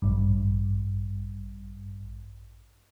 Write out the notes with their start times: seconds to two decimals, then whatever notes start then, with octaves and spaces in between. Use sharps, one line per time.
0.02 A1 G2